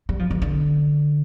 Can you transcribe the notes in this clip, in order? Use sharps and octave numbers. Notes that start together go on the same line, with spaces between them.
G3
F3
D#3
D3